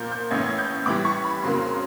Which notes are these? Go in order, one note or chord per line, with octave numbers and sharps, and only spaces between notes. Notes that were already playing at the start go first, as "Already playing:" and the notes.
Already playing: A#2 F3 A#3 G6
G6
A1 A2 E3 A3 C#4 G#6
G#6
G6
A2 E3 G3 D6
C#6
B5
F2 C#3 F#3 A#3 C6
C6